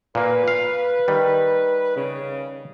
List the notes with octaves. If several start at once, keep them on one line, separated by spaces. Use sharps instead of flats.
A#2 A#3 B4
F5
D#3 G3
C#3